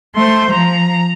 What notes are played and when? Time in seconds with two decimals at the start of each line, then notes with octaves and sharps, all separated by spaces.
0.15 A3 C5 C6
0.52 F3 A#5